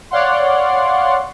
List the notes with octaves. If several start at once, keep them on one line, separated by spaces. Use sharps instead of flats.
C#5 D5 F5 F#5 C6